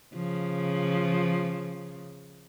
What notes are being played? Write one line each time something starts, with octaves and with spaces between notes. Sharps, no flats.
C#3 F3